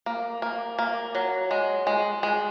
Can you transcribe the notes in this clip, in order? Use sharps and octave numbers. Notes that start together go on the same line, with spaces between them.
A#3
A#3
A#3
F#3
G#3
G#3
G#3